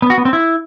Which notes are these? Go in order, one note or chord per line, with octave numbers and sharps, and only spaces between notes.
B3
F#4
B3
C4
E4